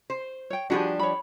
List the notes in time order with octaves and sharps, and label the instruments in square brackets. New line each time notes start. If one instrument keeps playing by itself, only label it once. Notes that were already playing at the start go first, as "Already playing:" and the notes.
[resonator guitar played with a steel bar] C5
[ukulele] C#5 G5
[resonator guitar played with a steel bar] F3 G3 D4 [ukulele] F#4 G#4
[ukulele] C#5 B5